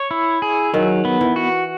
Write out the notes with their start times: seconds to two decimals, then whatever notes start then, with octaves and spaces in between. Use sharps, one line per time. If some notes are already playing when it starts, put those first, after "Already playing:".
Already playing: C#5
0.11 E4
0.42 G#4
0.74 D#3 F#3
1.05 B3
1.21 E3
1.36 F#4